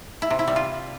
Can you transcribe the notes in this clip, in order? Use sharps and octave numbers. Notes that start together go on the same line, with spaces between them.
E4
C3
E4
G3
F4